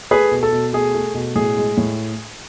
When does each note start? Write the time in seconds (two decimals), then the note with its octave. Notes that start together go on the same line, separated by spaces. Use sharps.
0.11 A3 G#4 B4
0.31 B2
0.43 A4
0.52 B2
0.73 A3 G#4
0.94 A3
1.15 B2
1.35 A2 G#4
1.57 G#3
1.77 A2